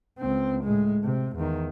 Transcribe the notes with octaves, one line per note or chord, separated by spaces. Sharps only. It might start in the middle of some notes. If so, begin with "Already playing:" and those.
C#2 C4
A2 G#3
C3
E2 D#3